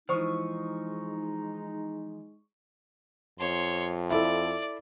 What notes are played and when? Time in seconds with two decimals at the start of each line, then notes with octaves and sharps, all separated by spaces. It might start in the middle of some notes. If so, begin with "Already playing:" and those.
0.09 E3 F3 G#3 D#4 C5 C#6 D#6
3.39 F2 C#5 C6
4.10 E4 A4 D5